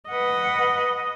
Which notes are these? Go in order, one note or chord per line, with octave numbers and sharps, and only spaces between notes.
B4 D#5 F#5